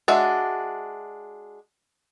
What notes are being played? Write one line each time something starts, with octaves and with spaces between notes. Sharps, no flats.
G#3 D4 F#4 E5